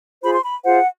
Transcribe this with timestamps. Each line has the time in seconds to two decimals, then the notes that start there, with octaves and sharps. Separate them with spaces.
0.23 F4 G#4 C5 B5
0.33 C6
0.44 B5
0.64 F4 G#4 C5 F#5